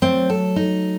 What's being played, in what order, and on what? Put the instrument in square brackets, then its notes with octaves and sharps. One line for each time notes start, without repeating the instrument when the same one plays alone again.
[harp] F#3 A3 [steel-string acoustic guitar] C4
[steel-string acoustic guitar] A4
D#4